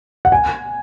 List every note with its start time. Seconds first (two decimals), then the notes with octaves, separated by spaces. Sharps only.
0.25 F#5
0.32 G#5